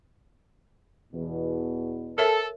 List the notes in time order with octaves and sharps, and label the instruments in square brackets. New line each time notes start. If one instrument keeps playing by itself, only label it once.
[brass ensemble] E2 B2
[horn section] A4 [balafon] A#4 C#5 E5